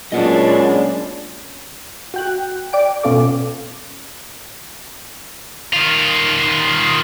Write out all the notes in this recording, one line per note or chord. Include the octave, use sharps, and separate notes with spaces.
A#2 F#3 G#3 B3 C#4 D4 D#5 F#5
F#4 G5 F#6
D5 G5 D7
B2 B3 C#4 F4 A4 D6
D#3 F4